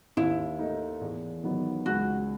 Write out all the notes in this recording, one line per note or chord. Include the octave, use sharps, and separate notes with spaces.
D#2 E4
D#3 A3 D#4
E2
D#3 F#3 B3
C#2 F#4